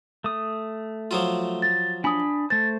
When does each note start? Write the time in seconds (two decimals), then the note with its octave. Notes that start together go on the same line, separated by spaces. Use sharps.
0.24 A3 D#6
1.11 F3 F#3 F4
1.62 A6
2.04 D4 G#5 B5 D#6
2.50 A3 C5 A6